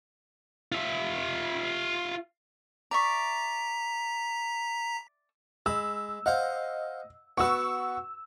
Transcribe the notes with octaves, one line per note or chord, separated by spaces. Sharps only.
F4 E5
D5 E5 A#5 C#6 B6
G#3 B5 E6
C5 D#5 F5 F#5
B3 F#4 B4 C#6 E6